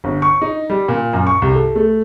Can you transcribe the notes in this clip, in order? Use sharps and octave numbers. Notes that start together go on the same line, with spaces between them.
G1
C#6
D#4
G3
A#2
F#2
C#6
C2
A4
A3